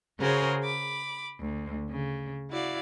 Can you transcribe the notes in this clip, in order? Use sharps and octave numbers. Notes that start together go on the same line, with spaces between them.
C#3 F#4 G#4 A#4 C5 C#5
B5 D6
D2
C#3
E4 F#4 D5 F5